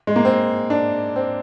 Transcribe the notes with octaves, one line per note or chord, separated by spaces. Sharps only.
G#3
A#3
C4
D4
C4